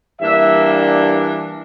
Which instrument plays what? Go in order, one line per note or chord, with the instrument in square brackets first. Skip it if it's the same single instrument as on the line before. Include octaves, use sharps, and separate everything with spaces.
[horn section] G2 E3 A#3 D4 E5